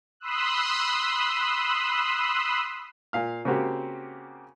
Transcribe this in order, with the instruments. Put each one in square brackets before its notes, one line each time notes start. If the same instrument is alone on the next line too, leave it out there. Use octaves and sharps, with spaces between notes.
[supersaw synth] B5 C6 D#6 E6 F#6
[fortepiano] A#2 F5 F6
C#3 A#3 C4 F#4 G4